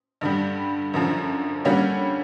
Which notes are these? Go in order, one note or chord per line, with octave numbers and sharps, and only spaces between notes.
G2 D3 G3
F#2 D3 F3
D3 G3 A#3 C#4 F#4